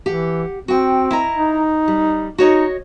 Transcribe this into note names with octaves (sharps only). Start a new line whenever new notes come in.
E3 G4 F#5
C4 F#4 G5
E4 D#5 A#5
D#4
G3
D#4 F#4 C#5 D#5